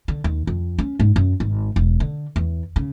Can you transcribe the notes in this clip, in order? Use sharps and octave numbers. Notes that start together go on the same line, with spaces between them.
D3
D#2
F2
C#4
G#2
F#2
G#1
E1
D3
E2
C#3